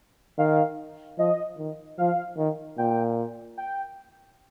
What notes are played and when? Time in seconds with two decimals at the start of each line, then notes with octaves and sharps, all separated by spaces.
0.38 D#3 F5
1.19 F3 D#5
1.58 D#3
1.98 F3 F5
2.38 D#3
2.78 A#2 G5
3.58 G5